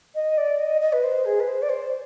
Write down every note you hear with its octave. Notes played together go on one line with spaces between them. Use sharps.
D#5
D5
D#5
D#5
B4
C5
G#4
B4
C5
D5
C5